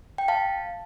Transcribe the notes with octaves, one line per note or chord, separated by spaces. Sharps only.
G5
F5 A5